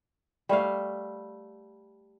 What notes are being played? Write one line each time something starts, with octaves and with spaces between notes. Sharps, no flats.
G3 A3 C#5 F5